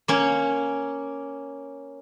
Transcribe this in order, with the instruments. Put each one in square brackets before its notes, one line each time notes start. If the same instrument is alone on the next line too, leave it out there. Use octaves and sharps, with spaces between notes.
[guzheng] A#3 C#4 C#5